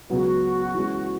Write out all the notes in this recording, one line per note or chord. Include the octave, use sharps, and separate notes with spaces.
C#2 C#3 F#3 B3 F#4
E3 G#3 C#4